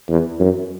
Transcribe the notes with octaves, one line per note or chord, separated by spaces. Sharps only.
E2
F#2